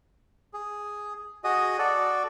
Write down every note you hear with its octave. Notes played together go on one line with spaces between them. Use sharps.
G#4
F#4 G#4 D#5
F#4 A4 D5